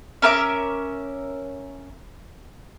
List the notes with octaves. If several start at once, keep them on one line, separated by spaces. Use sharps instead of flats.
C#4 A#4 E5 D6